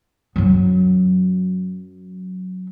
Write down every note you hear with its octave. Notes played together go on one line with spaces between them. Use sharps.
F#2 F#3